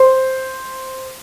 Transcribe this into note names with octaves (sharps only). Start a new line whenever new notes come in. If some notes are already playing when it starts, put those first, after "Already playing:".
Already playing: C5